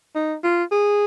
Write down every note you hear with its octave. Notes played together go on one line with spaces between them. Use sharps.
D#4
F4
G#4